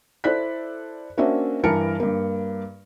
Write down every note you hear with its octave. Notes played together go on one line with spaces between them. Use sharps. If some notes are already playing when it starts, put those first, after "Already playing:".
E4 A4 C5 D5 F#6 B6
A#3 C#4 D4 F#4 C5 E5
G2 E3 A#4 A5 C#7 D7
G2 A#3